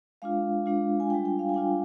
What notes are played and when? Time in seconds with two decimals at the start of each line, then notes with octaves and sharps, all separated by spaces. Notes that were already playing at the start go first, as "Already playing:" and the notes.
0.22 G#3 D4 F4 F5
0.66 G#3 D4 F4
1.00 G#5
1.10 G3 D4 F4 G5
1.25 G5
1.39 F5
1.49 G#5
1.54 G3 D4 F4 G5